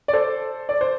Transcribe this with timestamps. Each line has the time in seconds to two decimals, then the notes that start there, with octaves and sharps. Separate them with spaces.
0.08 D5
0.13 A4 C5
0.69 D5
0.81 C5